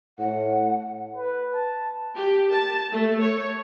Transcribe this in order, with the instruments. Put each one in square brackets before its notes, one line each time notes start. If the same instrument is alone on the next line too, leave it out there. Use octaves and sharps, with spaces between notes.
[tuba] A2 [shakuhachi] F#5
[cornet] B4
A5
[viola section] G4
A5
A3
C#5